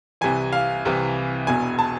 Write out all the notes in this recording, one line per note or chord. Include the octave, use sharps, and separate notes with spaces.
C2 C3 E3 G#5
F5
C2 C3 E3
E1 E2 B2 G#5
A5